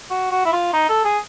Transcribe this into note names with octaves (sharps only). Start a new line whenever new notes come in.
F#4
F#4
E4
F4
D#4
A4
G#4